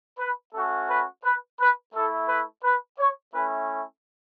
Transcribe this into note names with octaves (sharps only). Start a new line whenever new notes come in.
B4
A3 C#4 F#4 A4
B4
B4
B4
A3 E4 A4
B4
B4
C#5
A3 C#4 E4 B4